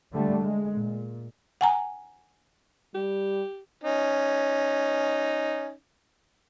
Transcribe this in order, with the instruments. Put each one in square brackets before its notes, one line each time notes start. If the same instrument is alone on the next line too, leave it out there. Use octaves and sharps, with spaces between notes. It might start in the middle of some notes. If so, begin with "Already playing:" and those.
[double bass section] D3 G3 A3
G#3
A#2
[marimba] F#5 G#5 A#5
[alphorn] G3 [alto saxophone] G4
[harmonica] C#4 D#4